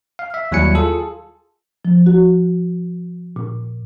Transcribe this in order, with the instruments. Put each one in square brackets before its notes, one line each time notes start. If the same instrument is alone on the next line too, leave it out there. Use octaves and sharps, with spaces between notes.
[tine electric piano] F5
E5
D#2 F#3 G3 E4 G#5 C#7
F4 G#4 A4
[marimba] F3
F#4
A#2